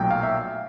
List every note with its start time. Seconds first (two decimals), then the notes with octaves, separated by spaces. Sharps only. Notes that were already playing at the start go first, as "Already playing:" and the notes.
Already playing: B1 A#2 F#3 A3 G5
0.11 F5
0.23 E5